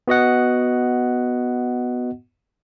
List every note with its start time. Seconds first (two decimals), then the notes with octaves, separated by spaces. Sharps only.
0.08 B3 F#4 D#5 F#5